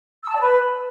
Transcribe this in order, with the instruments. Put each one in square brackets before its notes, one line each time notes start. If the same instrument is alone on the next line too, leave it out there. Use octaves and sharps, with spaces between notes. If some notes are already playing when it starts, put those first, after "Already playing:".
[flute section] E6
A5
D5
B4